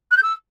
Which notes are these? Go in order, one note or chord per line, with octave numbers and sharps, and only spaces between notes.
F#6
G6
E6